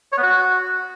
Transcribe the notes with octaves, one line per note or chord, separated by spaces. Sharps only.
C#5
B3
F#4